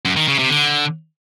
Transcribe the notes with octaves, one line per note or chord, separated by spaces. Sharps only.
F#2
D#3
C#3
C3
D3